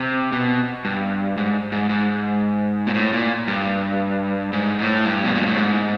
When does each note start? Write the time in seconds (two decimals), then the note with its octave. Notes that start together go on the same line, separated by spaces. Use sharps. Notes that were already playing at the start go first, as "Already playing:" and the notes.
Already playing: C3
0.32 B2
0.85 G2
1.37 G#2
1.72 G#2
1.89 G#2
2.87 A#2
2.94 A2
3.13 A#2
3.48 G2
4.53 G#2
4.79 A2
5.05 G2
5.24 B2
5.35 A#2
5.46 A2
5.57 G#2